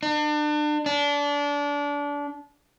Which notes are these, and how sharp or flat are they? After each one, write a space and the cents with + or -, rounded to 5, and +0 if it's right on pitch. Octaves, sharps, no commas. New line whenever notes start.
D4 +35
D4 -25